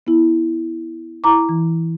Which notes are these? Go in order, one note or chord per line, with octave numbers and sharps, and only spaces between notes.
B3 E4
E4 A#5 D6
E3